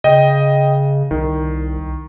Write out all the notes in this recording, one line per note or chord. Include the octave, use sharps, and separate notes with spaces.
C#3 D#5 G5
C2 D#3